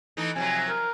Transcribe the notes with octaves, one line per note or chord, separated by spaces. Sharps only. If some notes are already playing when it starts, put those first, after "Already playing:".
E3 A3 D#4
C3 F3 F#3 G#5
A#4